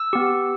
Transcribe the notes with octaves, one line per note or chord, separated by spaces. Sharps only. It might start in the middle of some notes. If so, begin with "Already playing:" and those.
Already playing: E6
B3 G4